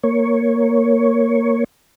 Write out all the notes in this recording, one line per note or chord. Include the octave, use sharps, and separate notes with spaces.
A#3 C#5